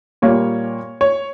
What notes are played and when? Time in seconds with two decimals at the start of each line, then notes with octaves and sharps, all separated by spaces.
0.22 A#2 G3 A#3 C#5
1.01 C#5